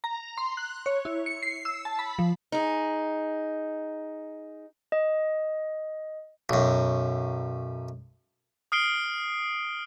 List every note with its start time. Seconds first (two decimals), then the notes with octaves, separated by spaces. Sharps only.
0.04 A#5
0.38 C6
0.57 F#6
0.86 C#5
1.05 E4
1.26 C#7
1.43 C7
1.65 E6
1.85 A5
1.99 B5
2.19 F3
2.52 D#4 G#4
4.92 D#5
6.49 B1 F#2
8.72 D#6 F6 C7 D7 G7